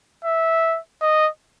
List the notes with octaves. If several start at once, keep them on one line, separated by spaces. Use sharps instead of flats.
E5
D#5